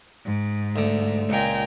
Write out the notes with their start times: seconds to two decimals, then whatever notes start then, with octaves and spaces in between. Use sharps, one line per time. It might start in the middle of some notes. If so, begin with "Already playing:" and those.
0.24 G#2
0.76 D2 D3
1.30 C#2 A#2 G5 G#5 A#5